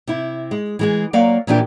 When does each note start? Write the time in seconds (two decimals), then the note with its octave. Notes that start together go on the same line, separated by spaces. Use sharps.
0.07 C3 E4
0.51 G#3
0.79 E3 G#3 G#4
1.13 F#3 A#3 D5 F5
1.47 A#2 E3 F3 D4 G4